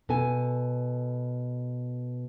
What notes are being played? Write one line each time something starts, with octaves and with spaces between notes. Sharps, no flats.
B2 A4 G#5